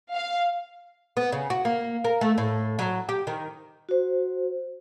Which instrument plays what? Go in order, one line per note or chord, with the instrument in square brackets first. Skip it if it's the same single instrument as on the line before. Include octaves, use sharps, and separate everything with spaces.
[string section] F5
[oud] B3
C#3
F#4
A#3
A#4
A3
A2
F#3
G4
D#3
[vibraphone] F#4 C5